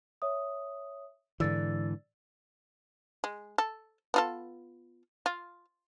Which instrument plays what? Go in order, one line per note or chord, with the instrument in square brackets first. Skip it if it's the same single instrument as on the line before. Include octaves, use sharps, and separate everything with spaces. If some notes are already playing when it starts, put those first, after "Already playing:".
[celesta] C#5 E5 D#6
[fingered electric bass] G#2 D3 E3 [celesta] D5 E6 A6
[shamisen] G#3
A4
B3 F4 A4
F4